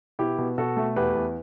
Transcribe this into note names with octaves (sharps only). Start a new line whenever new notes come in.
B2 E4 G4
B2
B2 F#4 A4
A3
E2 G4 B4
E2